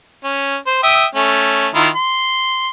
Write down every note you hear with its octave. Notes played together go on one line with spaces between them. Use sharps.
C#4
C5
E5 G5 D#6
A3 C#4
D#3 E4 F4
C6